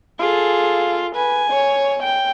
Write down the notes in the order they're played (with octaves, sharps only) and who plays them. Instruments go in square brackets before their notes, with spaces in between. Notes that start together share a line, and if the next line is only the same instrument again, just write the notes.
[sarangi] F4 [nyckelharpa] G#4 A4
[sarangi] B4 [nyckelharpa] G#5
[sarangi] C#5
G5